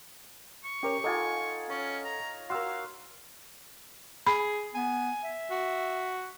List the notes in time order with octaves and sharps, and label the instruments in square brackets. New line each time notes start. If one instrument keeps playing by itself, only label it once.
[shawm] C#6
[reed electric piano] C#4 A#4 C#5 [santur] G4
[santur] D#4 F4 G#5 [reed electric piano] A4 F#5 G#6
[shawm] C#4 [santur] C#5
[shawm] A#5
[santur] F#4 A#4 [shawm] F5 [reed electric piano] C6 E6
[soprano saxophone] G#4 [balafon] B5
[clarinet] B3 [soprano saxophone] G#5
[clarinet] E5
[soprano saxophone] F#4